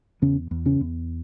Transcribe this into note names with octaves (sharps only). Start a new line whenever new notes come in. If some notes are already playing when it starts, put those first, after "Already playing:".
E2 C#3 C#4
E2
C#3 C#4
E2